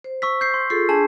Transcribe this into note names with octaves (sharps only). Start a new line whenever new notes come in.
C5
C#6 E6 B6
G6 C7
C6
F4 G#4 A4 C7
D4 G#4 G#5 A5